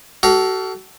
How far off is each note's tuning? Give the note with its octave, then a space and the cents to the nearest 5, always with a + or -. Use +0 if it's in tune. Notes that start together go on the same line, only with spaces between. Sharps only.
F#4 +40 A4 -5 F5 +0